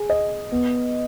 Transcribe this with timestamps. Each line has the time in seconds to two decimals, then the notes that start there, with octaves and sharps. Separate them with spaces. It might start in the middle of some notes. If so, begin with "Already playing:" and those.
Already playing: G#4
0.10 D#5
0.52 B3